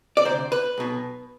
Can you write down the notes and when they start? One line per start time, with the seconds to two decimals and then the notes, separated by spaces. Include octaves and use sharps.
0.17 D5
0.25 D2 C3 C5
0.52 B4
0.78 B1 B2